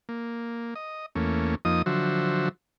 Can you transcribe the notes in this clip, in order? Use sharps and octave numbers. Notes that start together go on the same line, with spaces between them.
A#3
D#5
E2 A3 A#3 C#4
F2 F3 A#3 D#4 D#5 D#6
D3 F3 F#3 F#4 C5 E5